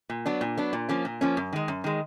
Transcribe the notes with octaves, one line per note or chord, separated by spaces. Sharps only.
A#2
F#3 B3 D4
A#2
F#3 B3 D4
A#2
F3 A#3 C#4
A#2
F3 A#3 C#4
F#2
D#3 G#3
F#2
D#3 G#3